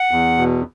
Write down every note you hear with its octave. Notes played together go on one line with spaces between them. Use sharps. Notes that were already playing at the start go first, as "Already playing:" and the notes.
Already playing: F#5
E2
B2